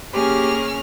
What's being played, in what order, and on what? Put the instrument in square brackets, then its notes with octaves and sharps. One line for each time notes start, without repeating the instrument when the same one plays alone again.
[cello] A#3 G#4 [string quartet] C#4 F6 [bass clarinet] G4